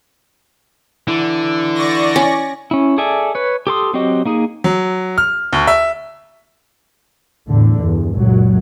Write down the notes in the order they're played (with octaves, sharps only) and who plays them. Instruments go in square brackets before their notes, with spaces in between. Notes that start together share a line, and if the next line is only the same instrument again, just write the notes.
[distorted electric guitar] D3 [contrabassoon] E3
[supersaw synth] D5 C#6 A#6
[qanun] C#4
[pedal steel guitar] C#4 E4
G#4 A4 D5 E5 G#5
B4 C#5
G4 A4 C6 D#6
F#3 C4 F#4 G4 D#5
A#3 D#4 G#4
[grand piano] F#3
F6
D2
E5
[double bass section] E2 A2 D3
E2 G2
C#2 F#2 A#2 F#3